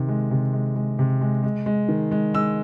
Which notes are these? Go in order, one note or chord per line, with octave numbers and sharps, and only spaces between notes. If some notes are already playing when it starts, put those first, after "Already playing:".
Already playing: C3 D#3
G#3
C3
G#3
G#3
C3
G#3
G#3
G#3
D#3
G#3
G#3 E6